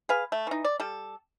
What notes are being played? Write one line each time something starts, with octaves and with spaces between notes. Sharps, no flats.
G#4 B4 F5
A3
E3 D#4
D5
G3 A4